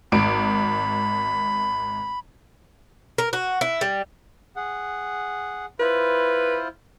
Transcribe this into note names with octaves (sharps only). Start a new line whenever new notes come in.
G#1 B5 D7
A#4
F#4
E4
G3
G#4 F#5
E4 F4 B4 C5